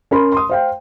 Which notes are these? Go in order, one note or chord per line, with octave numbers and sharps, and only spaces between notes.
C#4 A#4 B5 C6
C6 D#6
C5 F5 G5